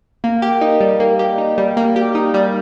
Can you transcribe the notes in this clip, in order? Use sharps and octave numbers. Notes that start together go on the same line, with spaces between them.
A#3
G4
D#4
G3
A#3
G4
D#4
G3
A#3
G4
D#4
G3